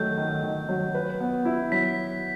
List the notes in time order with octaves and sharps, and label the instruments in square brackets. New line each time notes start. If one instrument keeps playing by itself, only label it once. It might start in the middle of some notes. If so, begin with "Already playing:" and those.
Already playing: [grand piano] D#3 F#3 A3 [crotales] G6
[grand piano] D#3
D#3
F#3
B4
B3
E4
[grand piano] F#3 [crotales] B6